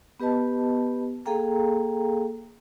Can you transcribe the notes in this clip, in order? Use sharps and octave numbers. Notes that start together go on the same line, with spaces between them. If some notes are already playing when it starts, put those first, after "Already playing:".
B3 G4 B4 D#5 A5
A#3 G#4 A4 F5 G5 A#5